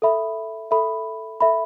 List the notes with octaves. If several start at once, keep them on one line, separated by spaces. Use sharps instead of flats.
A4 E5 B5
A4 E5 B5
A4 E5 B5